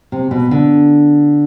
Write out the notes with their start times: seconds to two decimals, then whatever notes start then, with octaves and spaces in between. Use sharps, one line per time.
0.12 C3
0.31 B2
0.51 D3